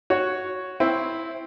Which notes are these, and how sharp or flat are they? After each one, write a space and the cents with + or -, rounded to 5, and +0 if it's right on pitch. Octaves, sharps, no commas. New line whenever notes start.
F#4 +0 C#5 +0
C4 +0 E4 +0